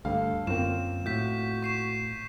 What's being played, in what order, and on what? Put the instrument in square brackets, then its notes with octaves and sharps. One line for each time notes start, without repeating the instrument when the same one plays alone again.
[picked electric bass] D2 [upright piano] G2 F5 [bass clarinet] A4
[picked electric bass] F#2 [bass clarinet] D3 [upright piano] A#3 C4 F4 [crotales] E7
[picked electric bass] A2 [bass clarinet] F#4 [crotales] G6 B6
[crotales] C#6 C7 E7